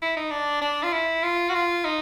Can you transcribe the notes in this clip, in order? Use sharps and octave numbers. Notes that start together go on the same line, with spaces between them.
E4
D#4
D4
D4
F4
E4
F4
F#4
F4
D#4